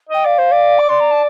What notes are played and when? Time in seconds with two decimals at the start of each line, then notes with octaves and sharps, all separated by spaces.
0.09 D#5 G5
0.25 D5 F5
0.39 C5
0.52 D5
0.79 D6
0.89 D5 C6
1.00 A#5
1.11 A5